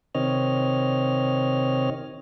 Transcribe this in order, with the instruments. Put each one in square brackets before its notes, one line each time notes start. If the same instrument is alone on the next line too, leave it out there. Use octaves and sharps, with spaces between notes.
[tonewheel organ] C3 D#3 C4 C#5 D#5 F6